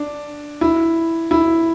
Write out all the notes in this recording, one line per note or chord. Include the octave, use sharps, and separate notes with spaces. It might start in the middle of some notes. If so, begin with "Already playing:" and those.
Already playing: D4
E4
E4